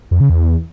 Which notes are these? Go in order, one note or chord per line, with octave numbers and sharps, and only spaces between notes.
F2
C#3
E2